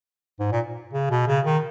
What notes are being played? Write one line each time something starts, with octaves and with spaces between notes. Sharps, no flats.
G#2
A#2
C#3
B2
C#3
D#3